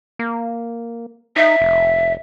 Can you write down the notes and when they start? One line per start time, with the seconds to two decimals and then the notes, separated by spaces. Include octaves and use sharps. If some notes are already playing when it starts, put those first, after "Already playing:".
0.19 A#3
1.36 D#4 E5
1.61 F1